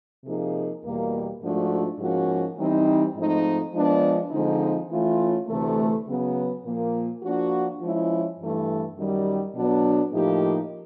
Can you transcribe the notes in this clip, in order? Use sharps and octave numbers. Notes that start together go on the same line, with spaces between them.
C3 F3 A#3 D#4 G#4
E2 B2 G3 A#3
G#2 F3 A3 D4 F#4
G#2 F3 A#3 C#4 F#4
E3 G3 C4 D#4
G#2 F3 A3 C4 D#4
F3 G#3 B3 D4
D3 F3 G#3 C4 D#4
E3 A3 C#4 F4
D2 C3 E3 A3
C#3 F#3 B3
A#2 F3 A#3
F3 A#3 D4 F#4
F3 G#3 C#4 E4
G2 E3 A3
F#2 D#3 G3
B2 F#3 B3 D4
A2 F3 A#3 D#4 G4